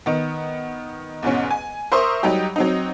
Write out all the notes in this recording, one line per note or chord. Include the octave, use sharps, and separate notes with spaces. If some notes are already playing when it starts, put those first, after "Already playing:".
D#3 B3
E2 G#2 B2 C#4
G#5
A#4 C5 E5 C6 C#6 D#6
F#3 G3 D#4 G4
F#3 C4 D#4